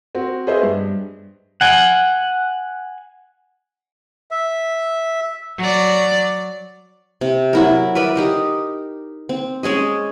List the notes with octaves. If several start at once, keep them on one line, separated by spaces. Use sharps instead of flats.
C4 F#4
G#4 B4 C5 D#5 E5
G2
F#5 G#5
E5
F#3 D5
C3
F#3 E4 A#4
A#4 B4 D5 E5
D#4 G4 A#4
C4
G#3 C#4 G#4 D#5